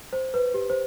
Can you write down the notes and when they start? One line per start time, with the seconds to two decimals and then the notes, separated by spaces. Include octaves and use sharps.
0.13 C5
0.34 B4
0.54 G4
0.70 C5